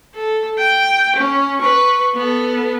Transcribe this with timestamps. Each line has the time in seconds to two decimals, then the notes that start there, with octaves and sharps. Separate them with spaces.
0.15 A4
0.59 G5
1.16 C#4
1.58 B4 C#6
2.15 B3 A4